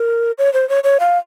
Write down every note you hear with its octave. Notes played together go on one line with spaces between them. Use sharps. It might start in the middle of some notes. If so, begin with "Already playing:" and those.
Already playing: A#4
C#5
C5
C#5
C#5
F5